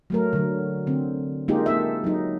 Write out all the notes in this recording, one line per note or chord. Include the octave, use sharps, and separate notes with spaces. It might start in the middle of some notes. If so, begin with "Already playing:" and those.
F#3 A3 A#4
D3 F#3
D3 C4
G#3 A#3 D#4 F4 G4 G#4
A#3 A4 E5
F#3 D#4